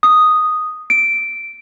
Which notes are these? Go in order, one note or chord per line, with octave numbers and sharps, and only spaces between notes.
D#6
D7